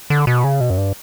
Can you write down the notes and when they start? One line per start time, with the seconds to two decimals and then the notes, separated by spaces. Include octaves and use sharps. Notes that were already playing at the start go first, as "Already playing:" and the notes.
0.10 D3
0.27 B2
0.44 C#3
0.61 B2
0.70 F#2
0.78 G2